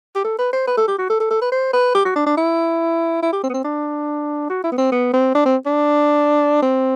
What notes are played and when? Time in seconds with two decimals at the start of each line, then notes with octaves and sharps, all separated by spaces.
0.15 G4
0.25 A4
0.39 B4
0.53 C5
0.67 B4
0.77 A4
0.88 G4
0.98 F#4
1.10 A4
1.20 A4
1.31 A4
1.42 B4
1.52 C5
1.73 B4
1.95 G4
2.05 F#4
2.16 D4
2.26 D4
2.37 E4
3.22 E4
3.33 G4
3.43 C4
3.50 B3
3.54 C4
3.64 D4
4.50 F#4
4.64 E4
4.72 B3
4.78 C4
4.92 B3
5.13 C4
5.35 D4
5.45 C4
5.66 D4
6.62 C4